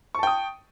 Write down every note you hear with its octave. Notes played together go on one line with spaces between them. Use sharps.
G5 A5 C#6 D#6